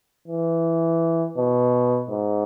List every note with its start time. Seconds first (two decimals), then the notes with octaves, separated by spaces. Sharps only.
0.28 E3
1.38 B2
2.10 G#2